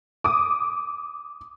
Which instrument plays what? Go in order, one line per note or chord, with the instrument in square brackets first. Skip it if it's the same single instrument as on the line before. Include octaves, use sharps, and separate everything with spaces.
[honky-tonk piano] D6 D#6